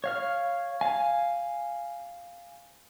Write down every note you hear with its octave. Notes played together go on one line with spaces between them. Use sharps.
C#5 F5 F6
F5 G#5